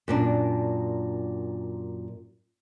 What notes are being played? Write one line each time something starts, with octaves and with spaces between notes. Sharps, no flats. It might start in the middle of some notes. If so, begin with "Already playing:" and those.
F#2 A#2 D4